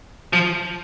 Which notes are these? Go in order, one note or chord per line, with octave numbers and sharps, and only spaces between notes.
F3